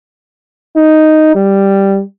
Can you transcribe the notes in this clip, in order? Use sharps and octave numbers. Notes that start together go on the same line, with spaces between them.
D#4
G3